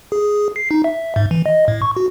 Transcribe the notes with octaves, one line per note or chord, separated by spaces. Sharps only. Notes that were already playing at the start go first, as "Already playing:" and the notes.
G#4
C7
D#4
E5
G#2
E3
D#5
A2
C#6
F#4